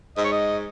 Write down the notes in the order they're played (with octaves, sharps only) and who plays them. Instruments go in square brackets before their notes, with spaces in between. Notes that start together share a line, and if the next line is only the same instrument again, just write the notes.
[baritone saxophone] G#2 [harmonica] D#5
[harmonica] C#5
D#5